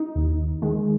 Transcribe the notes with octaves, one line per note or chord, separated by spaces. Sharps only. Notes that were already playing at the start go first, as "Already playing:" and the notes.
Already playing: D#4
D#2
D#3 G#3